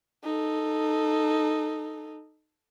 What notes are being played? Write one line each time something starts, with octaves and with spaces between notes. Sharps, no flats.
D#4 A4